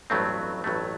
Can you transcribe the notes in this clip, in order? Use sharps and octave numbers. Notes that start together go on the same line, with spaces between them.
A1 G2 F#3 A3 C4
A1 G2 F#3 A3